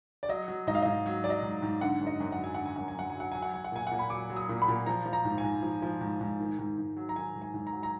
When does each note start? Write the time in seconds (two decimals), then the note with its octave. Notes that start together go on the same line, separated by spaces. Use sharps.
0.23 D5
0.29 F#3 D#5
0.48 F#3
0.67 G#2 D#5
0.75 F5
0.82 G#2 D#5
1.06 F#3
1.24 F#3 D5
1.30 D#5
1.43 G#2
1.62 G#2
1.81 D3 F#5
2.01 F#2
2.07 D#5
2.20 F#2
2.32 F#5
2.39 F#3 G#5
2.54 D3 F#5
2.66 G#5
2.76 F#2 F#5
2.88 G#5
2.96 F#2 F#5
3.10 G#5
3.16 F#3 F#5
3.32 F#3 G#5
3.42 F#5
3.54 F#3 G#5
3.64 F#5
3.72 A#2 G#5
3.87 A#2 F#5
3.99 B5
4.10 F#3 D6
4.30 F#3
4.37 D#6
4.49 A#2
4.62 B5
4.68 A#2
4.86 F3 A#5
5.06 F3
5.13 A#5
5.25 G#2
5.38 G#5
5.44 G#2
5.63 F3
5.82 F3
6.01 G#2
6.21 G#2
6.40 D#3
6.59 G#2
6.78 G#2
6.97 F#3
7.09 A#5
7.16 D#3 G#5
7.35 G#2
7.42 G#5
7.54 G#2
7.67 A#5
7.73 F#3
7.83 A#5